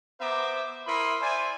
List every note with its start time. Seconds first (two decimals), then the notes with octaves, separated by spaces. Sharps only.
0.20 B3 C5 E5 A#5 D6
0.86 E4 A#4 B5 C6 D#6
1.21 C5 D5 E5 G#5